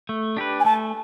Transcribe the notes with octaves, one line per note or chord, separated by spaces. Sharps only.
A3
D4 G4 B4
G#5
A3 A5